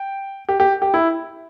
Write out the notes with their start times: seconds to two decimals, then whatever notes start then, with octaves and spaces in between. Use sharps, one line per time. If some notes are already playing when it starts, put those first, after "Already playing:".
Already playing: G5
0.49 G4
0.60 G4
0.82 G4
0.94 E4